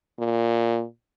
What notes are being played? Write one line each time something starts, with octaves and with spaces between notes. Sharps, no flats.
A#2